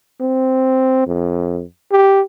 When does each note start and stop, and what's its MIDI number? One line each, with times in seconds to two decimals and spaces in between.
0.21 1.04 60
1.07 1.63 41
1.92 2.21 67